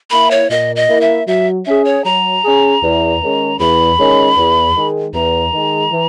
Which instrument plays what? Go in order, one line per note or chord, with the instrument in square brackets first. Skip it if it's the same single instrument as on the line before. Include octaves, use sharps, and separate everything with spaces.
[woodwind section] A#3 E4 [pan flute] B5
[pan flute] C#5
[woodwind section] A#2 [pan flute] D#5
[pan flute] D#5
[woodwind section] A#3 E4
[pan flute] E5
[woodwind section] F#3 [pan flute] E5
[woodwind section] C#4 G#4 [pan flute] E5
[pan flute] C#5
[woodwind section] F#3 [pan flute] A#5
[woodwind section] C#4 G#4
E2
D#3 G#3 C#4
[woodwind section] E2 [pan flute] B5
[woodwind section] D#3 G#3 C#4
E2
D#3 G#3
[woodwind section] E2 [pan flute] A#5
[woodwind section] D#3 G#3
E3